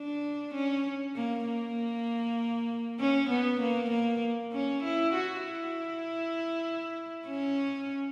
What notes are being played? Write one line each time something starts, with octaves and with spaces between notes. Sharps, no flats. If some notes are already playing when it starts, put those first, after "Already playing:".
Already playing: D4
C#4
A#3
A#3
C#4
B3
A#3
A#3
C#4
E4
F#4
E4
C#4